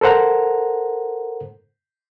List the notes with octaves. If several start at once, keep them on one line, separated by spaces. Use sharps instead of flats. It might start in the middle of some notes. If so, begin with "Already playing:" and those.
A4 A#4 C5 F#5 A#5